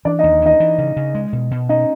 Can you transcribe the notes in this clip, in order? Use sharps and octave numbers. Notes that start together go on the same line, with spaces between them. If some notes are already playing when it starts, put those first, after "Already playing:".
E3 D4 D5
D#4 D#5
D#2
E3 D#4 D#5
E3
C#3
C#3
G#3
B2
B2
C#4 D#4 D#5